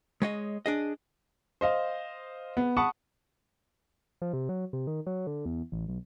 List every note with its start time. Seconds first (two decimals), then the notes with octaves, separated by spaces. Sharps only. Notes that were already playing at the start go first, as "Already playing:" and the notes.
0.22 G#3 C#5 D#5
0.66 D4 G#4 D#5
1.61 C5 D#5 F5
2.57 B3
2.77 F#5 A5 B5 C#6 D#6
4.22 F3
4.33 C3
4.49 F#3
4.73 C3
4.87 D#3
5.07 F#3
5.27 D3
5.45 E2
5.72 A1
5.89 B1